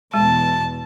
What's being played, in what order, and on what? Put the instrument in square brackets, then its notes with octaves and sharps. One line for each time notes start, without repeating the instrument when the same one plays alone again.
[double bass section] E2 B2 [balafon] G#3 [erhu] A5